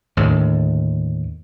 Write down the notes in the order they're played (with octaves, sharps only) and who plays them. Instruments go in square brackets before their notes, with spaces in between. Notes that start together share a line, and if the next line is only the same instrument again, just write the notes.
[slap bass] D#2 A2 D3